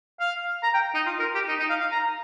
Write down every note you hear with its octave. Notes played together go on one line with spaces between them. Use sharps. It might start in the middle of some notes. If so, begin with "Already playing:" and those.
F5
A#5
G5
D#4
F4
A#4
G4
D#4
D#4
F5
F5
A#5